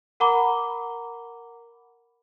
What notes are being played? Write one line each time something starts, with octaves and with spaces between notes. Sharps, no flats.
A#4 F#5 A#5 B5 D6 G7